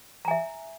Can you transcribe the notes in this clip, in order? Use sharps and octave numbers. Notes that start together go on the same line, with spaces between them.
E5 G#5 A#5